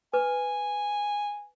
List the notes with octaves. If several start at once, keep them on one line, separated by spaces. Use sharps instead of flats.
B4 G#5